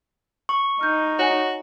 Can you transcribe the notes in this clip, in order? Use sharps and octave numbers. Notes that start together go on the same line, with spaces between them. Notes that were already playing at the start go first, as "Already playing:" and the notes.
C#6 F#7
D#4 F6 G6
F#4 C#5 G#5